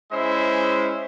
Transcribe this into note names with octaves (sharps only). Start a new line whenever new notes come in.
G#3 C#4 E4 C5 E5